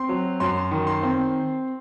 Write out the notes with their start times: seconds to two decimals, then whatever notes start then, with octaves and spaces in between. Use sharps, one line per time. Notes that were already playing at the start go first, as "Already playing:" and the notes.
Already playing: C4 C6
0.09 F#3
0.40 F#2 C6
0.71 D#3
0.87 C6
1.03 C4